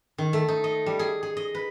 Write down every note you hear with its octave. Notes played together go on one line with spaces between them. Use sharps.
D#3
A3
D#4
D#5
G3
G#4
G#4
D#5
B4